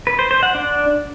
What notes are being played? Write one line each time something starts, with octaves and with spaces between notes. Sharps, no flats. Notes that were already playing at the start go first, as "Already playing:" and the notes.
B4
C5
C5
F#5
D4